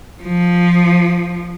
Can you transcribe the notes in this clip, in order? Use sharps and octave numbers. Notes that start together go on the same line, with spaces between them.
F3